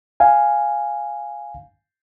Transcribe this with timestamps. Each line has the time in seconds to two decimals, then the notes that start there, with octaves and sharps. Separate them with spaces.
0.20 F5 G#5